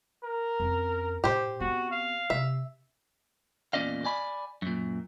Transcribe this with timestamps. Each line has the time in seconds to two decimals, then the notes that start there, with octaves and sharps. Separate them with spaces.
0.24 A#4
0.60 F2 C#4
1.24 A2 G4 C5
1.60 B3 C4 F#4
1.91 F5
2.30 C3 E5
3.73 E2 A#2 C#4 D5 D#5 F5
4.04 D5 G#5 B5
4.62 F#2 A#2